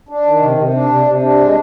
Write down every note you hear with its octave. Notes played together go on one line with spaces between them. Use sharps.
D4
D#3
C3
C3
D4
C3
C3
D4
G#3